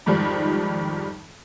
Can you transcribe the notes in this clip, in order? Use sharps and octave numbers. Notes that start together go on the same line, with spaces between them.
F2 G#2 D#3 F3 G3